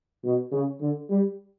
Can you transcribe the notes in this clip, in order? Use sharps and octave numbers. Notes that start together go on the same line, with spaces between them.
B2
C#3
D3
G3